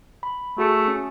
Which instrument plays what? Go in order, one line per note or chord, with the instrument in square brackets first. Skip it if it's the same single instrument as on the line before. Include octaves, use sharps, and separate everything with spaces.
[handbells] B5
[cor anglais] A3 [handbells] F#4 G#4 C#7
[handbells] C#4